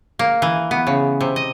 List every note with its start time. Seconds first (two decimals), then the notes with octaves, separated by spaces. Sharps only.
0.19 A#3
0.42 E3
0.71 B3
0.87 C#3
1.21 C3
1.36 D#5